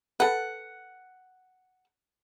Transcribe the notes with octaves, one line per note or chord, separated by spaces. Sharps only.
A4 B4 F#5